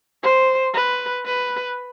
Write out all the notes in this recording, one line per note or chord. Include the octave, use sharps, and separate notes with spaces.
C5
B4
B4